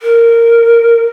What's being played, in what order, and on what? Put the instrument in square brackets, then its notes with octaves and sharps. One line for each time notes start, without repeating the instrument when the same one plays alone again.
[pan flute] A#4